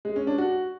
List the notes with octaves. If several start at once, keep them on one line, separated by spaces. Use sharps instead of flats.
G#3
C#4
D4
F#4